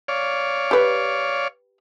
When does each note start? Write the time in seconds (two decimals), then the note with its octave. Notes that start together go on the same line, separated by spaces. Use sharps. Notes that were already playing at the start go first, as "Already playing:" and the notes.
0.08 C#5 D5 F5
0.71 G4 B4